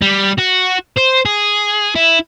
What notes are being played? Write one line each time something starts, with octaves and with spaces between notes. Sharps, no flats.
G3
F#4
C5
G#4
E4